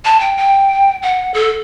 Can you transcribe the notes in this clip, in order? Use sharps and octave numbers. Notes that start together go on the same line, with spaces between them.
A5
G5
G5
F#5
A4